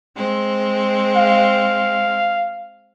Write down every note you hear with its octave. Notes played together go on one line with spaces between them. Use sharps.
G#3 C4
F5